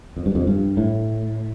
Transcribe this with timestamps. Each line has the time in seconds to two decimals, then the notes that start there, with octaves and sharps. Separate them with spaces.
0.17 F2
0.26 G2
0.35 F2
0.47 G2
0.77 A2